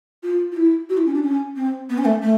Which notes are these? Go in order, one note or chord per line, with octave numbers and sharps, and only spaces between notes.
F4
F4
E4
F#4
E4
C#4
D4
C#4
C4
B3
C#4
A3
A3